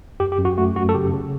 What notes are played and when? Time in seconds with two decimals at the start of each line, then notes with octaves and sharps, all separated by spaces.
0.20 F#2 G4
0.32 G4
0.39 F#2
0.45 F#4
0.58 A3 F#4
0.76 F#2 F#4
0.89 A4
0.95 C#3 G4
1.13 C#3